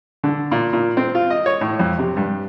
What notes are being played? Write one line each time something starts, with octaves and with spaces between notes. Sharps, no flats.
D3
A#2
A#2
C4
F4
D#5
C#5
A2
F2
C3
G2